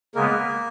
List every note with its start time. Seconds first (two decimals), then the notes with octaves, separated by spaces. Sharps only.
0.15 C#3 G#3 A#3 B3 A#4